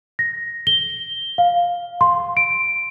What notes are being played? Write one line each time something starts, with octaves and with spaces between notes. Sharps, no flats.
A#6
G7
F5
C6
D7